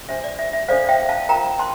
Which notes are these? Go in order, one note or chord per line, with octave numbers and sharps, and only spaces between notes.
D4 G4 C5 E5
D5
E5
E5
D4 A4 C5 D5 F5
E5 G5
F5 A5
F4 A#4 G5 A#5
A5 C6